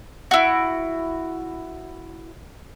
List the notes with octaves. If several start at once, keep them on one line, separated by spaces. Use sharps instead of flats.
E4 F#4